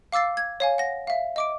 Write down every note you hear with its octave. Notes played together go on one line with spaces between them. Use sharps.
F5 D6 E6 A6 C7
G#6
C#5 F5 G#5
F#5 A#6
E5 F5
D#5 D6 D7